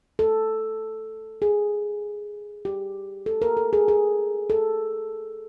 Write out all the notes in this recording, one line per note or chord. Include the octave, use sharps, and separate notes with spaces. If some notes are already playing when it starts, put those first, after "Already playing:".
A4
G#4
G4
A4
A#4
A4
G#4
G#4
A4